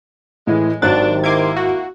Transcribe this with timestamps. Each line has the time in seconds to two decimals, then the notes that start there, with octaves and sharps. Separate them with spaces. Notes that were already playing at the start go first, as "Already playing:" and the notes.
0.47 A2 E3 G#3
0.82 G#1 D#3 F#3 D4 G4 C5 F#6 A6
1.24 A#3 E4 C6 D6 G#6
1.56 F#4